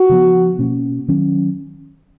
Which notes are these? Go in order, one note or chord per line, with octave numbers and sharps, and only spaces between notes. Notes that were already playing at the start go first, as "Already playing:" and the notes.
Already playing: F#4
C#3 F3 B3
B2 A#3 C#4
D#3 F#3 C#4